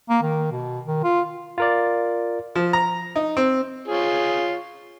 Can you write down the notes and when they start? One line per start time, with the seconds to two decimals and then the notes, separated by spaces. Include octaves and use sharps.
0.09 A#3
0.23 D#3
0.51 B2
0.86 D#3
1.04 F4
1.58 F4 A#4 D5
2.56 F3
2.73 A#5
3.16 D#4
3.37 C4
3.88 F4 G#4 C#5